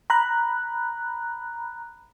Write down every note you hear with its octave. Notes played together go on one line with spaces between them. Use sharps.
A#5 B5 F#6